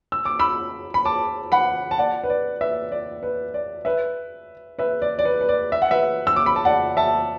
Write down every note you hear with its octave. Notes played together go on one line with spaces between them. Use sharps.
E6
D6
B5 E6
B5
A5 D6
F#5 B5
A5
D5 F#5
B4
D5
B4 E5
D5
B4
D5
B4 E5
B4 E5
D5
D5
B4
B4
D5
E5
F#5
B4 E5
E6
D6
B5
A5
D5 F#5
E5 A5